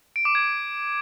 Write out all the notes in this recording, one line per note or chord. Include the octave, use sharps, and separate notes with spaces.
D7
D6
G#6